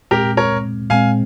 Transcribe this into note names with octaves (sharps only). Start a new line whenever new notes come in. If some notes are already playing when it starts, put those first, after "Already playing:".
A#2 G#3 C4 G4 A#4
A#4 C#5
A#2 G#3 C4 F5 G#5